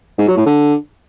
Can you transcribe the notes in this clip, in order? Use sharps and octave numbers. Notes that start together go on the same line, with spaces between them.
G#2
F#3
A2
D3